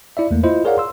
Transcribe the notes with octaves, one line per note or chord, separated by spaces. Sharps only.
E4 D5 E5
E2 A3 A#3
E4 F4 C5 D#5
G#4 A#4 C#5 D5 F5 F#5
C6 E6